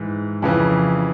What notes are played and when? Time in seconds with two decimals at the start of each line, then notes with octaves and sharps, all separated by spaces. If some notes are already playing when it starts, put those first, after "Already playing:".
Already playing: G#2 E3
0.42 F2 C#3 E3